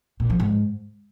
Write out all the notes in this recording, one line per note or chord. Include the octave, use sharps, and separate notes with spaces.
A#2
F3
G#2